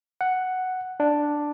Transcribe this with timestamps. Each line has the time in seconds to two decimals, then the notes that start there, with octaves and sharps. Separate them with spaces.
0.21 F#5
1.00 D4